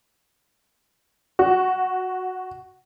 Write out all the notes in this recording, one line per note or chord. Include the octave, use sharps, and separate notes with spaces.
F#4